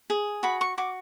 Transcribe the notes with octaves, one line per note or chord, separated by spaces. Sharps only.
G#4
F#4 B5
C#6
F#4 D6